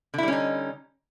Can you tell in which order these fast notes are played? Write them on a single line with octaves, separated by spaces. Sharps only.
D3 E4 G3 C#4 D#4